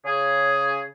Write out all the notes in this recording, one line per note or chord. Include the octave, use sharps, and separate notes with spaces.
C#3 G#4